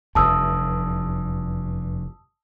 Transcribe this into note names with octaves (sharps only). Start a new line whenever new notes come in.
F1 E2 G2 A5 D#6 E6